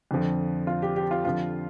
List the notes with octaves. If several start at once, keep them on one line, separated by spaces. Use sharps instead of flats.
F2 D3 F3
F4
G4
G4
F4
F2 D3 F3 F4